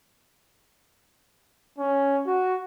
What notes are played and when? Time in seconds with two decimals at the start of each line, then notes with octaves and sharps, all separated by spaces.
1.78 C#4
2.27 F#4